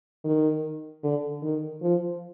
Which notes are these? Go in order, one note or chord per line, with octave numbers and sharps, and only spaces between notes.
D#3
D3
D#3
F3